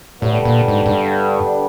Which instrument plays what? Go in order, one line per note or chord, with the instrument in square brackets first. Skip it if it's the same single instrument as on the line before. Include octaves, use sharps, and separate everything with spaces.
[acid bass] A2 [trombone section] D3 G3 B3 D4
[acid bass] A#2
G#2
G#2
G2